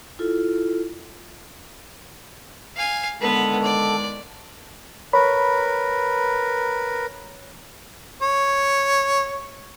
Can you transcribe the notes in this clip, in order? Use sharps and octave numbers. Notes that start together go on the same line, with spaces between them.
E4 F4 A4
F5 G#5
D3 D#3 G#3 B3 A4 B4
D5
A#4 B4 C#5 B5
C#5